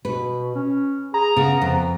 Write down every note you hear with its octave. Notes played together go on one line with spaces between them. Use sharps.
B2 B4
C#4
G#4 A#5
C#3 B3
F2